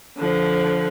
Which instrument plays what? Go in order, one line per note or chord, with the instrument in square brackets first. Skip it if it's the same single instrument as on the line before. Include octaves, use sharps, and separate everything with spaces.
[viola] D3 F3